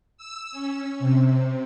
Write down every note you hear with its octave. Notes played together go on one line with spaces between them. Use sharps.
E6
C#4
C3